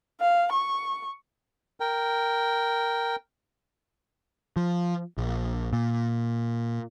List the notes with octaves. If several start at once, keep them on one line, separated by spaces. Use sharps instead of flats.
F5
C#6
A#4 G5
F3
A#1
A#2